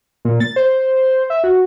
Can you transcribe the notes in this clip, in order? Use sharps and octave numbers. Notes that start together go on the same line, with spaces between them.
A#2
A6
C5
E5
F#4